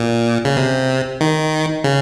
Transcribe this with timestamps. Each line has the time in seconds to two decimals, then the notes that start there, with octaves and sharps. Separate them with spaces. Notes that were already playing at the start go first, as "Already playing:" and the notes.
Already playing: A#2
0.45 C#3
0.57 C3
1.21 D#3
1.84 C#3